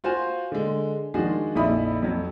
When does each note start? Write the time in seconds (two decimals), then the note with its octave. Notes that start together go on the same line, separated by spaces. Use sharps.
0.04 F4 F#4 C5 F5 G#5
0.52 D3 G#3
1.14 D#3 F3 G#3 D4 F#4 G#4
1.55 A#1 F2 D#4 E4 B5 D#6
2.02 F2 F#3